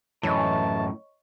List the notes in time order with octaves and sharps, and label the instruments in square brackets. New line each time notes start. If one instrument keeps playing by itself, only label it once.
[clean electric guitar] F#2 A2 [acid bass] E3 [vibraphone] C#5 D#5 C#6 [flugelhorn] A5